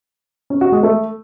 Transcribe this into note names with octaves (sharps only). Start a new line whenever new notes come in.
C#4
F#4
G#3
A3